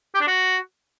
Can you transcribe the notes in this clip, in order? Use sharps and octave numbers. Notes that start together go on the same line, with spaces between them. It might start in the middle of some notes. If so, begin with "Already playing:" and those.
G4
D4
F#4